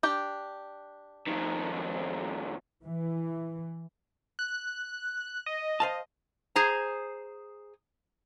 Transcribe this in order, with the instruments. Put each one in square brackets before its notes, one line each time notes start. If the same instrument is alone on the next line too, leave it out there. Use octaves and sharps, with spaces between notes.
[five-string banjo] D4 G4 G5
[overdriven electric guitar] F2 D#3
[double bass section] E3
[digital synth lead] F#6
D#5
[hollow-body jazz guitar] C5 F5 A5
[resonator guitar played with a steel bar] G#4 C5 A#5